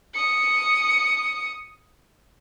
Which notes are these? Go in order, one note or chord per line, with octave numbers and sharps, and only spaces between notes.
D#6 C#7